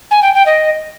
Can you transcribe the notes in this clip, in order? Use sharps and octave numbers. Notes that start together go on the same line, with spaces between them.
G#5
G5
G5
D#5